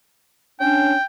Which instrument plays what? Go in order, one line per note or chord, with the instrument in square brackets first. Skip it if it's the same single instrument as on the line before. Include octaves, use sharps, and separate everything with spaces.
[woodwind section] C#4 D4 [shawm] G5